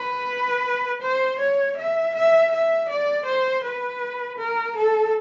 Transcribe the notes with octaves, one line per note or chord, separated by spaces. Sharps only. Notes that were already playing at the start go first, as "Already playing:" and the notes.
Already playing: B4
C5
C#5
E5
E5
E5
D5
C5
B4
A#4
A4